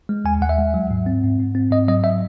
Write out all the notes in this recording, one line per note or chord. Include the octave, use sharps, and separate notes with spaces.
G#3
D#2 G#5
D#2 F#5
E5
G#3
F#3
G#2
C4
G#2
G#2
C4
G#2 D#5
F#3 D#5
E5